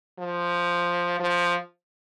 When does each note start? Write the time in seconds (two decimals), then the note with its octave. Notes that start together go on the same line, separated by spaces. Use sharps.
0.19 F3
1.20 F3